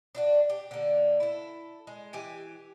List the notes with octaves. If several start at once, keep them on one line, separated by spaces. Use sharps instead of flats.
D4 E4 F#4
G4
D3 A#3
E4 A4
G#3
E3 G4 G#5